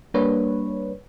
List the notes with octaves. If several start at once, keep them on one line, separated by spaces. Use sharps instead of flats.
G3 A#3 D4 B4 C#5